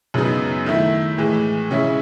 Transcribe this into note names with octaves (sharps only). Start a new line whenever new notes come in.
F#2 C#3 G#3 B3 D#4
D#3 A3 E4
A2 E3 G#3
C#3 G#3 C#4 E4